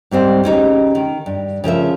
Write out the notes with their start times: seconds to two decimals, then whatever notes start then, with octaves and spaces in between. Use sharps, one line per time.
0.11 G#2 G3 C4 C5
0.44 C#3 C#4 D#4 G4
0.95 D#3
1.26 G2
1.64 C#3 F3 A#4 E5